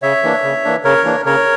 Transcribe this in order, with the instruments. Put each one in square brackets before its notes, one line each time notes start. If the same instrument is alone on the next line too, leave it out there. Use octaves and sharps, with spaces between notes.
[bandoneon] C#3 C#5 E5
E3 A#3 D4
C#3
E3 A#3 D4
C#3 A#4 C#5
E3 A#3 D4
C#3 A#4 C#5